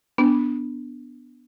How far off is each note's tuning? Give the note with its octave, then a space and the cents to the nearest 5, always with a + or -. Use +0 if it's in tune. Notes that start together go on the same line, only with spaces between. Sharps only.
B3 +0 D4 -5